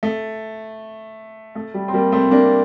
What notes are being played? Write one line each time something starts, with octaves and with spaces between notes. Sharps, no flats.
A3
A3
G3
C4
G3 A#3
A3 C4
A#3 D4